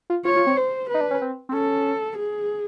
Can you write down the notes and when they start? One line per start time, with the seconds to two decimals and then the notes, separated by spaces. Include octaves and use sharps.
0.10 F4
0.25 F4 C#5
0.36 F4
0.47 C4
0.57 C5
0.89 B4
0.94 D#4
1.01 D4
1.11 C#4
1.22 C4
1.49 C4
1.53 C#4 A4
2.17 G#4